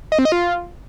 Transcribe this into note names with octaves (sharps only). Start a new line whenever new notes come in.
D#5
C4
D#5
F4